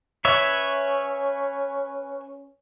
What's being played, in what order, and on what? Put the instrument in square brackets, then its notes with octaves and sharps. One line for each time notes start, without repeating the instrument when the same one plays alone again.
[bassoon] C#4 [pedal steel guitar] B4 C#5 E5